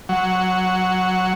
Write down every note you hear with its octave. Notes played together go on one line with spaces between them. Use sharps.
F#3